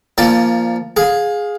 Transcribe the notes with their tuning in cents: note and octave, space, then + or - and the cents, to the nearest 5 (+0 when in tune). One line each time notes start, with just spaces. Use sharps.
F3 -15 A#3 +0 D5 +5
G#4 +0 F5 +25